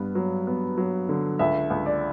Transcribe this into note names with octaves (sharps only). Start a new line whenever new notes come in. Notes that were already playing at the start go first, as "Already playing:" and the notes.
Already playing: G2 B3
F#3
B3
F#3
D3
C#2 E5
C#2
D5